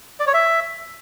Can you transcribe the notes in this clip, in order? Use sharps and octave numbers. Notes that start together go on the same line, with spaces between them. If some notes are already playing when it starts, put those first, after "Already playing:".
D5
C#5
E5